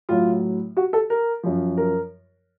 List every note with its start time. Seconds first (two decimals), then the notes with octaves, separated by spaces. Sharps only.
0.09 A2 F#3 F4
0.77 F#4
0.93 A4
1.10 A#4
1.43 F#2 F3
1.78 A#4